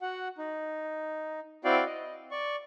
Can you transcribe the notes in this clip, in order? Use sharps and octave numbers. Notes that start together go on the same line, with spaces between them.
F#4 F#5
D#4
C4 E4 F#4 D5 F5 G5
D#5
D5 C#6